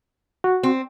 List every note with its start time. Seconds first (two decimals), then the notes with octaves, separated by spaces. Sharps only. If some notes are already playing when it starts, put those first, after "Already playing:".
0.44 F#4
0.63 C4